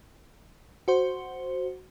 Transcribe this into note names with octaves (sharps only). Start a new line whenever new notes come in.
F#4 C5